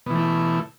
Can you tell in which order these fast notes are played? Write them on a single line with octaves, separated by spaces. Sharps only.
B2 E3 A3 E4